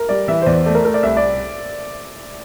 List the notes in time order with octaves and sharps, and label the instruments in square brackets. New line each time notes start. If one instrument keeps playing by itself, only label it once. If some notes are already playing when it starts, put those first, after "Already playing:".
Already playing: [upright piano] A#4
[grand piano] G3 [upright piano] D5
[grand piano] E3 [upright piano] E5
[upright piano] C5
[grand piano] E2 [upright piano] D5
[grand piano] A3 [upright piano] D5
[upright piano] A#4
[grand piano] A3 [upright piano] A#4
[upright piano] D5
[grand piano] C2 [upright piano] E5
[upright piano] D5